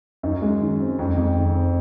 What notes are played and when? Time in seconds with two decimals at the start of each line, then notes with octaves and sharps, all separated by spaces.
0.23 F#2 D#4
0.42 G#3
0.60 D#3
0.80 C4
0.98 F2 D#4
1.17 F2 G#3
1.36 D#3
1.54 C4